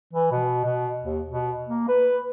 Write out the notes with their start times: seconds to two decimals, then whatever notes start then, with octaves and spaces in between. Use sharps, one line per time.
0.13 E3
0.31 B2
0.65 B2
1.03 D#2
1.29 B2
1.67 A#3
1.88 B4